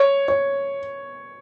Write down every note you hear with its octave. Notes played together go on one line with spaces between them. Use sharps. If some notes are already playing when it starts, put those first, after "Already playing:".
Already playing: C#5
C#5